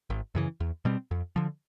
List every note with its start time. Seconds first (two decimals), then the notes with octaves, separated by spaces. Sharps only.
0.10 G#1
0.35 F#2 C#3 E3
0.60 E2
0.85 B2 G3 C4
1.11 F2
1.36 D3 F3